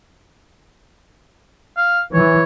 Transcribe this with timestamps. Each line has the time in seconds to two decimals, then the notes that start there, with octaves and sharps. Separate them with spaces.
1.77 F5
2.13 E3 C#5